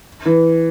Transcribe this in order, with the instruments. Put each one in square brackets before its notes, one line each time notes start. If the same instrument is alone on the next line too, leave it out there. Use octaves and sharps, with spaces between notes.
[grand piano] E3